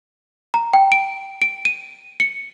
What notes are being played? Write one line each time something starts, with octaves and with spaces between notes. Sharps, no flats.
A#5
G5
D7
D7
D#7
C#7